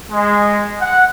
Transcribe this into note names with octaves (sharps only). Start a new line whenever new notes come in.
G#3
F#5